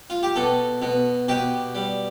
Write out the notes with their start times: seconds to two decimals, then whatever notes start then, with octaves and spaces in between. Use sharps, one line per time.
0.10 F4
0.23 G4
0.36 B2 A4
0.82 B2
1.28 B2 G4
1.75 G3